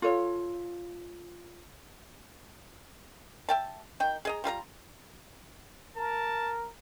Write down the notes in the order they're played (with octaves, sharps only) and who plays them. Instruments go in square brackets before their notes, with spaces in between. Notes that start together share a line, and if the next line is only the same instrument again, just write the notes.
[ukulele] F4 A4 C#5
[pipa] E5 G5 A5
D#3 G5
G#4 D#5 A#5
G3 F4 A#4 A#5
[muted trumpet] A#4 [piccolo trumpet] A5